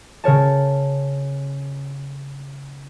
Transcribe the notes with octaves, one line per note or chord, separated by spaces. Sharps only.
C#3 A#4 C#5 A5